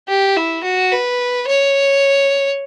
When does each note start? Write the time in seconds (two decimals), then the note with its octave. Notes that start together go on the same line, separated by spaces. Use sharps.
0.08 G4
0.36 E4
0.63 F#4
0.92 B4
1.48 C#5